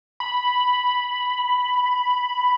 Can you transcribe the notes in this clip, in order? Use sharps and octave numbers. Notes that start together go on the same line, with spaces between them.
B5